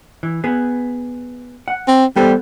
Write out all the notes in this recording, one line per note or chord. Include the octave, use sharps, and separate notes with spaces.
E3
B3 G#4
F#5
C4
G3 B3 A4 C5